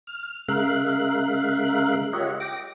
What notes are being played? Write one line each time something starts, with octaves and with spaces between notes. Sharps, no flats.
F6
C#3 G#3 A#4 E5 F5 F#6
F4 G4 C#5 D#5 E5 F#5
G5 D6 A#6